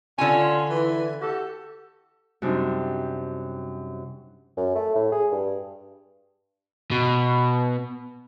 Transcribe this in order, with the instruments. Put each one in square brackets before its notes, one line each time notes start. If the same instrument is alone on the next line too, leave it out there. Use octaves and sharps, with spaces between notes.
[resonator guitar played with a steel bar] D3 G#5 [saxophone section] C#4 F4
[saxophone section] E3
F#4 G4 A4
[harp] F#2 C3 G3 D4 D#4 C5
[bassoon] F#2
A3
A2
G#4
G2
[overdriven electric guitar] B2